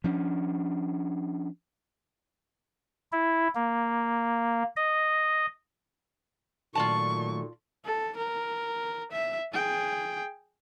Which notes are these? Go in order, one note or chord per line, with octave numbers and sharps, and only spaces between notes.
F3 C#4 D4
E4
A#3
D#5
A#2 D#3 F#3 A3 F4 D5 A5 C#6
A4
A#4
E5
G#4 G5